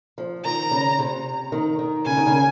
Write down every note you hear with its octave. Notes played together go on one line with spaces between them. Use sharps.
F3
D#3 A#5
C#3
C3
D#3
D#3
C#3 G#5
D#3
C#3